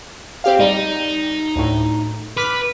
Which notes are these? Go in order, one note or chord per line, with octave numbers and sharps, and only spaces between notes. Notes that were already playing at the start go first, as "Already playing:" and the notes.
C4 G4 F5
G3 D#4
D2 A2
B4 D6 F6 B6